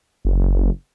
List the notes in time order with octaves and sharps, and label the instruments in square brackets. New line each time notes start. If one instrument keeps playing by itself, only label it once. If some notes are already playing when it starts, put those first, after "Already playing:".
[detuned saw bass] F#1